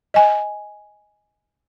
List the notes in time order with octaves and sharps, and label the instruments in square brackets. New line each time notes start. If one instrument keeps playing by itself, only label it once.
[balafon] D#5 G#5